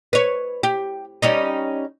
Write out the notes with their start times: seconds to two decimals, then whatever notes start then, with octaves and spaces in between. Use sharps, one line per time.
0.13 B4 C#5
0.63 G4
1.22 G3 C#4 D#4